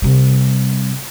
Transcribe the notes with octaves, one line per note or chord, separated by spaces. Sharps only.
C3 G3